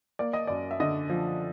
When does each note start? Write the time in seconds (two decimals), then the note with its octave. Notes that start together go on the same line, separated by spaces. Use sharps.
0.19 A#3 D5
0.33 D#5
0.47 F#2 D5
0.71 E5
0.80 D3 D#5
1.09 F3